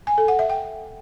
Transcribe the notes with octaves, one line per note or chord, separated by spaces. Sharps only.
G#5
A4
F#5
E5
G5